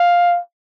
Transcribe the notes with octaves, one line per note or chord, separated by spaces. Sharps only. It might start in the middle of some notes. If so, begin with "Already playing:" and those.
Already playing: F5